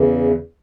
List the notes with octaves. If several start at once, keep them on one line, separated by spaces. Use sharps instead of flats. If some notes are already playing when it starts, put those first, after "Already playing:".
Already playing: E2 C#3 E3